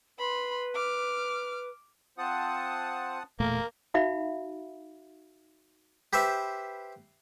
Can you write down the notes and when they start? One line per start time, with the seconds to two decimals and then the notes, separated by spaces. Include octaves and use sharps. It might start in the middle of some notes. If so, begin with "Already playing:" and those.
0.18 B4 B5 C6
0.75 D6 F6
2.18 C4 F4 C5 F#5 A5 D#6
3.40 E1 A#2 A3 A#3 A#4
3.94 D#4 F#4 E5 F5 B5
6.13 G4 B4 C5 E5